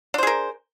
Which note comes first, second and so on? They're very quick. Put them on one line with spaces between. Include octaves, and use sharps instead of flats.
D4 C5 G#4 A#4